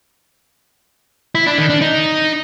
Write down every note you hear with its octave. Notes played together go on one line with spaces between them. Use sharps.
E4
D4
D#3
D4
D#4